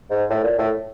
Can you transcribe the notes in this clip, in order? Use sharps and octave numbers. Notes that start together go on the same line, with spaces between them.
G#2
A2
A#2
A2